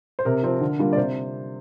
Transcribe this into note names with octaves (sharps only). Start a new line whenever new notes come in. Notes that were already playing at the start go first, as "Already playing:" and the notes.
C5
C3 A#4
F3 C4
D3
G3 A#3 D4 F4
D5
C3 C5